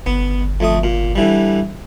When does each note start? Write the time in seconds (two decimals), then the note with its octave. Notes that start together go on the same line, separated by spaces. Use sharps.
0.06 G1 B3
0.60 F2 A3 D#6
0.84 A#2
1.15 D3 E3 G3